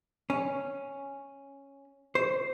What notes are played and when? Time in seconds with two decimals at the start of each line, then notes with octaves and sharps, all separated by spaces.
0.30 C#4
2.15 C5